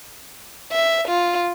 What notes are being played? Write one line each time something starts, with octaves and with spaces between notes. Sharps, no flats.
E5
F4